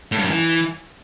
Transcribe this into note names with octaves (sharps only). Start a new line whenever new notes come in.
A2
G2
F#2
E3